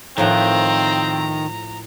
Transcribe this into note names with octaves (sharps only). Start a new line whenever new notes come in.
A2 D#3 F3 C4 F#5 A#5